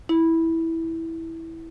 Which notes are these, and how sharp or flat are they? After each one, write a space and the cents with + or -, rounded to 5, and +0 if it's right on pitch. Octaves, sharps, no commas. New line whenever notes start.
E4 -10